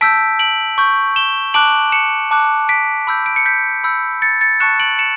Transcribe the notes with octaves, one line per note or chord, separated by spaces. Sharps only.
A5 E6 G6 B6 D7
D7 F#7
C#6 G6
E7 G7
A5 D6 F#6 D7 F#7
C#7 E7
A5 D6 F#6
B6 D7
B5 E6 G6
D7
C#7
G6 B6
B5 E6 G6
A6 C#7
A6 C#7
A5 C#6 F#6 C#7 E7
D7 F#7
C#7 E7